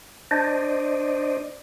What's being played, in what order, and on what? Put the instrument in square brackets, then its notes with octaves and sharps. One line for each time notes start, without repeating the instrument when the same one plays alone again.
[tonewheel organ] D4 C5 D5 D#5